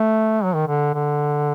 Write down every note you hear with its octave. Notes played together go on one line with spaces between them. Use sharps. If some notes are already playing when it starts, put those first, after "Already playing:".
Already playing: A3
F#3
D#3
D3
D3